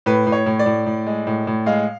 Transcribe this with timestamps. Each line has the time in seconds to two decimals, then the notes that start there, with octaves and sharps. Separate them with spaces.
0.06 A2 B4
0.27 A2
0.32 C#5
0.46 A2
0.59 D5
0.66 A2
0.86 A2
1.07 G#3
1.27 A2
1.47 A2
1.66 G#3 F5